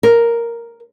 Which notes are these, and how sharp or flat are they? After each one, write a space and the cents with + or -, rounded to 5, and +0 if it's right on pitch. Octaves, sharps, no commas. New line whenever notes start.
A#4 +0